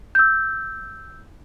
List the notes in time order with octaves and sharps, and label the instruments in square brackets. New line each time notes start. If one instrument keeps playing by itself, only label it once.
[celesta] E6 G6